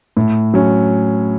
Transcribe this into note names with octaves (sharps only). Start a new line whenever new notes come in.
A2
F#3 C#4